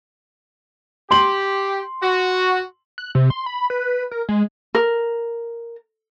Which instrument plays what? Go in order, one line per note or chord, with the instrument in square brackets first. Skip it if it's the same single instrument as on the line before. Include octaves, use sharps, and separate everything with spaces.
[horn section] G4 [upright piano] C6 F#7
[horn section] F#4
[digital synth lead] F#6
C3
C6
B5
B4
A#4
G#3
[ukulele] A#4